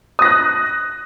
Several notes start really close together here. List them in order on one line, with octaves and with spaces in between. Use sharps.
D#6 A#6 F#6